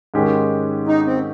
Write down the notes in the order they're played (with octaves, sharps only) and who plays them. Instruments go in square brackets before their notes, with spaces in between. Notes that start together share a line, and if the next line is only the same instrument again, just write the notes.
[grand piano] G#2 D#3 G#3 C#4 G4
[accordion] D#4
C4